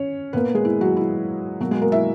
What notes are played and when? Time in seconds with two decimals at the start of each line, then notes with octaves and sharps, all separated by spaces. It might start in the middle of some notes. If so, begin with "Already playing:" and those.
Already playing: C#4 C#5
0.33 A#2 A#3 B3 B4
0.54 G#3 G#4
0.65 E4
0.81 F#3 F#4
0.97 E4
1.60 B2 F#3 A#3 F#4
1.71 G#3 G#4
1.82 A#3 A#4
1.92 E4 E5